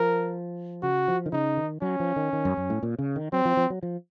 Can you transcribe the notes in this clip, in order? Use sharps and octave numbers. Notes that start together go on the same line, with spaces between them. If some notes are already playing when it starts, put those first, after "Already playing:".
Already playing: F3 A#4
C#3 F#4
F3
D#3
C#3 D#4
D#3
F#3 C#4
F3
D#3
D#3
F#2
F#2
A2
A#2
C#3
D#3
F#3 C4
F3
F3
F#3
F3